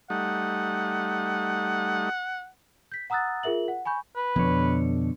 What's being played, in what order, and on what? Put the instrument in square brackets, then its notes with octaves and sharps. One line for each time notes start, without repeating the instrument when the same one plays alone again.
[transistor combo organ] G3 A3 D#4 [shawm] F#5
[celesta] G6 B6
F#5 A#5 D#6 E6 F#6 A6
F4 G#4 A#4 E5 F#7
F#5
G#5 B5 C#6 G6
[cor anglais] B4
[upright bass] F2 [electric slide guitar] B2 D3 C#5